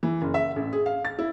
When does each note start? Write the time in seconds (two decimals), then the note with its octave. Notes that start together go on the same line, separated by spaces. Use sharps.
0.03 E3
0.22 F#1
0.34 E5
0.56 A1
0.73 G#4
0.86 F5
1.05 A6
1.19 E4